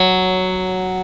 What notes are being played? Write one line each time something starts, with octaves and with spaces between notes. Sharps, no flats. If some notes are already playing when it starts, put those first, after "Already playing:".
Already playing: F#3